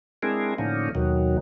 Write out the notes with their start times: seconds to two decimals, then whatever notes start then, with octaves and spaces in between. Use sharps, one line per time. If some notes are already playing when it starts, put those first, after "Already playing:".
0.23 G#3 C4 D4 E4 G#4 A#4
0.58 A2 D3 F3 A#3 C#4 D#4
0.95 D#2 B2 D#3 F#3